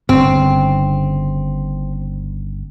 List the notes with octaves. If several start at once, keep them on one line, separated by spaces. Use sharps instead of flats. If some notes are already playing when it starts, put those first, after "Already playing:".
G1 G2 C#3 C4